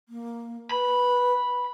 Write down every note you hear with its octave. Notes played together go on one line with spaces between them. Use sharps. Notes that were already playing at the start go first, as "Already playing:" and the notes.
A#3
B4 B5